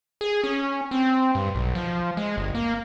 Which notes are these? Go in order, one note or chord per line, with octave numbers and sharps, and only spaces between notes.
G#4
C#4
C4
G2
B1
F3
G#3
G1
A#3